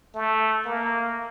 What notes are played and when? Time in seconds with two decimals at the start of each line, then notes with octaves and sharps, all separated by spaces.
0.15 A3
0.65 A#3